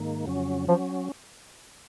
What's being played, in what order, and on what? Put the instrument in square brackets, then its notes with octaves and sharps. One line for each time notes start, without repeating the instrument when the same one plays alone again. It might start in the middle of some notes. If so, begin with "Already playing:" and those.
Already playing: [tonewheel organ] G#2 D#3 A#3
F2 C#3 F#3 C#4
[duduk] F3 [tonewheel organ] F#3 C#4